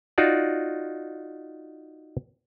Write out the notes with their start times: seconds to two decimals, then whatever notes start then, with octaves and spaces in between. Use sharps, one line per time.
0.18 D#4 F4 F#4 D5